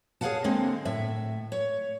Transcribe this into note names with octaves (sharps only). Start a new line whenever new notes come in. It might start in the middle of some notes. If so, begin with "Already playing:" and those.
G#4 C#5 D5 F5 F#5 A5
D3 G#3 A#3 C4
A2 E5
C#5